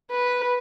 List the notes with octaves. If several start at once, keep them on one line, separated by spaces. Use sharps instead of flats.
B4